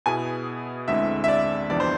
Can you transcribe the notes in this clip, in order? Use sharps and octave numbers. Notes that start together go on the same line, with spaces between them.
B2 B3 E4 G#4 G#5
D2 D3 G#3 C4 E4 E5
E5
D5
F2 C3 E3 B3 D4 D5
C5